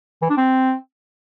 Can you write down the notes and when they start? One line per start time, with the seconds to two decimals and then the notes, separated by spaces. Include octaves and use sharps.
0.22 E3
0.30 D4
0.37 C4